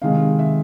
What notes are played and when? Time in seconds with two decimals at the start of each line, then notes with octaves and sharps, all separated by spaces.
0.02 C3 D#3 G#3 F5
0.39 E5